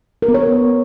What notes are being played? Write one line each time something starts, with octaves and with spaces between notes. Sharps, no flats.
A#4
B3
C#5